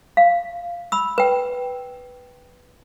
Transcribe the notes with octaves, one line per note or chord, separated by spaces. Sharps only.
F5
B5 E6
B4 G5